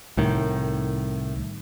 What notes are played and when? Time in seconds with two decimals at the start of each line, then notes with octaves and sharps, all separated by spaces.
0.17 C2 A2 D#3